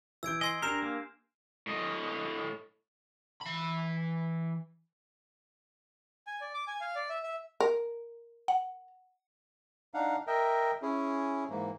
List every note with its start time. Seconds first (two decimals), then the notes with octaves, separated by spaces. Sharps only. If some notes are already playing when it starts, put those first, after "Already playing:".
0.23 E3 E6 G6 G#6 D7
0.41 D#5 G#5 C6 C7
0.62 D4 G4 A#4 G6 C7 E7
0.82 A#3
1.67 A2 D#5
3.41 E3 B5
6.27 G#5
6.41 D5
6.54 D6
6.67 G#5
6.81 F5
6.95 D5
7.10 E5
7.23 E5
7.60 A#4
8.48 F#5
9.94 D4 D#4 F5 F#5
10.27 A#4 D#5 E5 G5
10.82 C#4 E4 G#4
11.50 G#2 E3 A#3